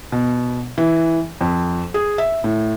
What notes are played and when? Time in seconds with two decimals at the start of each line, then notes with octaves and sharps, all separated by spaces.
0.12 B2
0.78 E3
1.41 F2
1.94 G#4
2.18 E5
2.44 A2